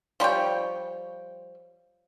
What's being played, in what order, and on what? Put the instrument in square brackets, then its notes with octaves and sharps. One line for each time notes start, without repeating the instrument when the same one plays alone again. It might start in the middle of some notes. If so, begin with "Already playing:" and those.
[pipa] F3 G3 C#5 G5